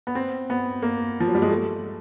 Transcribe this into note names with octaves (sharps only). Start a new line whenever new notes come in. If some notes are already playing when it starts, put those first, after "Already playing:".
B3
C4
B3
A#3
F3
F#3
G3
G#3
A3